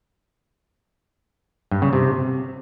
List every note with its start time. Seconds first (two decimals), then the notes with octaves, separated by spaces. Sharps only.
1.71 G2
1.82 C#3
1.93 C3